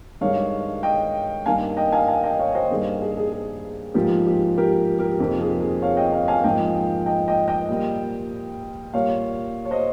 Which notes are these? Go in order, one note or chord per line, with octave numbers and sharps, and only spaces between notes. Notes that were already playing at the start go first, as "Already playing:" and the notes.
G2 D#3 G#3 C#5 F5
D#5 G5
G2 D#3 A#3 F5 G#5
D#5 G5
F5 G#5
F5 G#5
D#5 G5
C#5 F5
C5 D#5
G2 D#3 A#3 G#4
G#4
G#4
G#4
G#2 F3 A#3 G4
G4
G4 A#4
G4 A#4
F2 C3 D#3 A#3 G4
G#4
G#4
C#5 F5
D#5 G5
C#5 F5
F5 G#5
G#2 F3 A#3 D#5 G5
D#5 G5
D#5 G5
D#5 G5
A#2 G3 A#3
A#2 G3 A#3 C#5 F5
C#5
C5 D#5